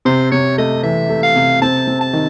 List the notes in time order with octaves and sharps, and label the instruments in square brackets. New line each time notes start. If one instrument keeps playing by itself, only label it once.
[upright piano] C3 [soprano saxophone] C5
[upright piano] C3 [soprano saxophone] C#5
[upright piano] A3 [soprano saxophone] D#5
[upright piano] E3 [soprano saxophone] E5
[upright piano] A3
[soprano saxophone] F5
[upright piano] C3
[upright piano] C4 [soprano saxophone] A5
[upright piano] C4
[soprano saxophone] A5
[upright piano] D#3